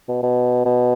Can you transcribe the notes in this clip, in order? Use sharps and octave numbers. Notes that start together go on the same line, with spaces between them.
B2
B2
B2